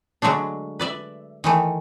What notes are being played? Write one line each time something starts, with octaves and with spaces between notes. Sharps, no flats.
D3 F#3 G#3 A3 D4
B4 D5 E5
D#3 E3 A3